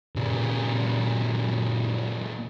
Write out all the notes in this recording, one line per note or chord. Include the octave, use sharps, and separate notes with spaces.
A#2 C#3